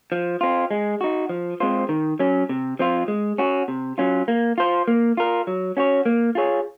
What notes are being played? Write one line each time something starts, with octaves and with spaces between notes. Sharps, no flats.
F3
C4 F4
G#3
D#4 F#4
F3
G#3 C4 F4 C5
D#3
F#3 C#4
C3
F3 C4 F4
G#3
C#4 F#4
C3
F#3 C#4 F4
A#3
F4 C5
A#3
F4 A#4
F#3
C#4 F#4 C#5
A#3
F4 G#4 C#5